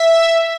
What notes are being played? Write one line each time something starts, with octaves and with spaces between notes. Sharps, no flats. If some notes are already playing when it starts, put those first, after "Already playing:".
Already playing: E5